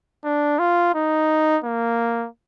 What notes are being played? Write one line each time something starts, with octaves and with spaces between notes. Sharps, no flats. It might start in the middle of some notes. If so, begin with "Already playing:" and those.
D4
F4
D#4
A#3